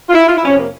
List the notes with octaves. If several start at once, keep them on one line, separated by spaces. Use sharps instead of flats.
F4
E4
F4
E4
F2 C3 F3 C#4
A#3